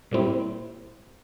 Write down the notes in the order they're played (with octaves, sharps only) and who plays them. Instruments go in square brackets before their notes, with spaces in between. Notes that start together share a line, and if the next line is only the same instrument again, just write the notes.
[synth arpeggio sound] A#2 G3 C4 E4